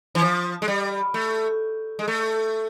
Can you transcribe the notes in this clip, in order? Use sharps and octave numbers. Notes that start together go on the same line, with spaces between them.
E3
F3
G#3
G3
A3
G#3
A3